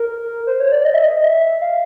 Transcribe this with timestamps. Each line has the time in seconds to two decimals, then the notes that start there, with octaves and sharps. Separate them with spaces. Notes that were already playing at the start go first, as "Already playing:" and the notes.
Already playing: A#4
0.47 C5
0.60 C#5
0.72 D5
0.85 D#5
0.94 E5
1.03 D#5
1.23 E5
1.61 F5